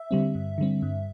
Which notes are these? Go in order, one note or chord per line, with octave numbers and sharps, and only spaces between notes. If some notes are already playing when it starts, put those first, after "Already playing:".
Already playing: E5
D3 G3 C4
G2
D3 G3 C4
G2